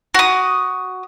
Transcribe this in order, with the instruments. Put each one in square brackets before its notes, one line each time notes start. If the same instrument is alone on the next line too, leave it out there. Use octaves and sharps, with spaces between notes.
[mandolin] F#4 D#6